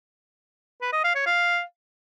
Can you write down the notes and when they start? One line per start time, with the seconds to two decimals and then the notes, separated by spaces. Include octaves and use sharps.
0.82 B4
0.93 D#5
1.04 F5
1.15 C#5
1.26 F5